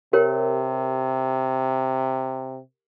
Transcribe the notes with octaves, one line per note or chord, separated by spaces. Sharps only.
C3 G4 A#4 C#5